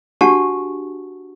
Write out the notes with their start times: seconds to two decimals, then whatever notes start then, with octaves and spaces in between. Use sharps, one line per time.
0.21 D4 F#4 G4 F#5 A5 C#6